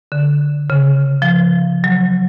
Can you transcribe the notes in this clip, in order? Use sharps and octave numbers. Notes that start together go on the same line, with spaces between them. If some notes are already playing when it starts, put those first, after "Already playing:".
D3
C#3
F3
F#3